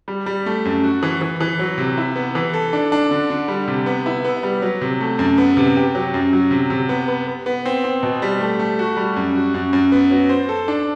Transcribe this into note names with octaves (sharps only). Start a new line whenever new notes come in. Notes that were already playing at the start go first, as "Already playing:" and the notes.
G3
G3
A3
F#2
F#4
E3
E3
E3
F#3
C3
E4
B3
E3
A4
D4
D4
D3
D3
G3
C3
B3
E4
B3
G3
F#3
C3
A3
F#2
B3
C3
G4
F#3
F#2
F#3
C3
C3
B3
B3
B3
B3
C4
C4
B2
G3
A3
A3
F#4
G3
F#2
F#4
F#2
F#2
B3
F#3
C5
A4
D4